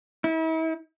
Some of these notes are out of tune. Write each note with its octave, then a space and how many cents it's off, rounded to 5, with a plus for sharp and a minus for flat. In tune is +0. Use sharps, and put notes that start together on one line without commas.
E4 -40